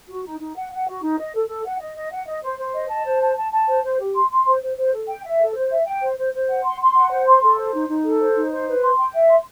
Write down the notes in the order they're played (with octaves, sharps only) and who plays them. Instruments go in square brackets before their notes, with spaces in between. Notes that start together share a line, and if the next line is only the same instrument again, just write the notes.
[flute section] F#4
D#4
D#4
F#5
F#5
F#4
D#4
D#5
A4
A4
F#5
D#5
D#5
F#5
D#5
C5
C5
D#5
A5
C5
A5
A5
A5
C5
C5
G4
C6
C6
C5
C5
C5
A4
G5
E5
A4
C5
E5
G5
C5
C5
C5
F#5
C6
C6
F#5
C5
C6
A4
C5
D#4
D#4
A4
C5
D#4
C5
B4
C6
G5
E5
C6